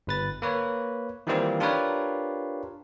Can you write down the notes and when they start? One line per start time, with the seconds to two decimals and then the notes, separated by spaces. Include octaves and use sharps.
0.07 G1 B4 A6
0.42 A#3 B4 C#5
1.27 D#3 E3 G3 A#3 C4 F4
1.60 D4 F4 G4 A#4 B4 C#5